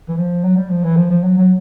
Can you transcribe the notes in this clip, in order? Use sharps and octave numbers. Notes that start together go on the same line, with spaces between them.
E3
F3
F#3
G3
F3
E3
F3
F3
F#3
F#3